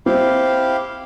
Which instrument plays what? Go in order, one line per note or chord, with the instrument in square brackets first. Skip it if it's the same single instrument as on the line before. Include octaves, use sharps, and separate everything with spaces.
[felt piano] C4 [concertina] E4 G4 F5